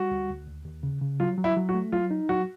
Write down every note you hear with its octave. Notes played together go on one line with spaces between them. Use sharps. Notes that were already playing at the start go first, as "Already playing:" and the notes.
Already playing: G3 F#4
D2
D2
D#2
D#2
C#3
C#3
F#3 F4
F#3
E4
F#3
F#4
A3
F#3 F4
D#4
F#3 F#4